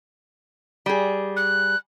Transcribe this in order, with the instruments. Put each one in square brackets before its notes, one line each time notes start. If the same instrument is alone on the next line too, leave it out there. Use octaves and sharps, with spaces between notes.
[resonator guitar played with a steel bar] G3 G#4
[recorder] F#6